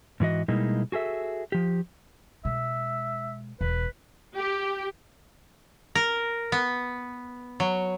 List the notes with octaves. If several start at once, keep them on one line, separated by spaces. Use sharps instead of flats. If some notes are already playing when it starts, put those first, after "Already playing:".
G#2 E3 F#4 D#5
B2 G3 G#3 A#3 D#4 E4
F#4 G#4 A4 E5
F3 G4
B2 G#3 E5
E1 B4
G4
A#4
B3
F#3